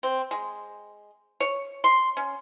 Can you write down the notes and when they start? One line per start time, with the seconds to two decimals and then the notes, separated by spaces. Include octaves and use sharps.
0.03 C4
0.31 G#3
1.40 C#5
1.84 C6
2.17 C#4